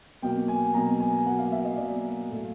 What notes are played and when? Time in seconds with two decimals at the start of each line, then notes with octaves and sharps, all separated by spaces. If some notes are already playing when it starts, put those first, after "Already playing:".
0.22 B2 F#3 A#3 G5
0.48 G#5
0.74 B2 F#3 A#3 A#5
1.00 G#5
1.26 B2 F#3 A#3 F#5
1.39 F5
1.52 E5
1.65 D#5
1.77 B2 F#3 A#3 D5
2.29 A2 F#3 A3